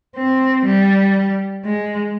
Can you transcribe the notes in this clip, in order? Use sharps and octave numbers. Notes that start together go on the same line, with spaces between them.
C4
G3
G#3